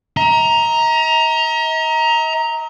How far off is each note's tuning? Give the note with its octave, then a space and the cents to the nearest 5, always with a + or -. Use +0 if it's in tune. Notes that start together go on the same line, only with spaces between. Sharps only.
D#5 +45 A#5 +0